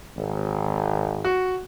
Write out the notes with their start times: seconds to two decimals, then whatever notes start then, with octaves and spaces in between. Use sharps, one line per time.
0.15 G#1
1.24 F#4